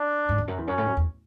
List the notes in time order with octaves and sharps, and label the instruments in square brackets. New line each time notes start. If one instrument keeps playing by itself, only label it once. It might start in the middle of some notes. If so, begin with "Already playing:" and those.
Already playing: [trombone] D4
[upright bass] G#2
E2
F#2
E2
[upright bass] F#2 [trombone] C#4
[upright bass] A2
F#2
E2